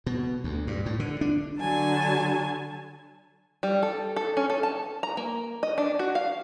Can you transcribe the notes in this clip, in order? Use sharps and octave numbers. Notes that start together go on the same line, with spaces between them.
B2
D2
G2
A2
D3
D4
D3 F#3 G#5 A5
G3
A4
A4
C#4
A4
A5
A#5
A#3
D#5
D4
F#4
F5